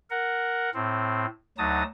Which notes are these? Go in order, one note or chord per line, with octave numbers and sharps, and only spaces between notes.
A#4 F#5
A2 C4
D2 F#3 D#4 A5 D#6